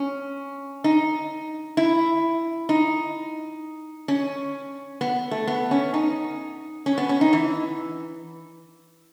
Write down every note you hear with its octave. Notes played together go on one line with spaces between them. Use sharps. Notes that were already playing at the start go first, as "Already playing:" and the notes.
Already playing: C#4
D#4
E4
D#4
C#4
B3
A3
B3
C#4
D#4
C#4
B3
C#4
D#4
E3